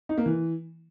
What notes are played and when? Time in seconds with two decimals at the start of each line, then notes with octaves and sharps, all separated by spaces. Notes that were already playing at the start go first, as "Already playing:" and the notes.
0.09 D#4
0.18 A#3
0.26 E3